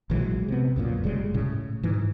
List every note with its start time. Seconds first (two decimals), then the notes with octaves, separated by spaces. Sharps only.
0.10 A#1 E3 F#3 G#3
0.48 C3 B3
0.76 C#2 F#2 A#2
1.04 F#1 C#3 G3 G#3
1.34 A2 C#3
1.83 G#2 E3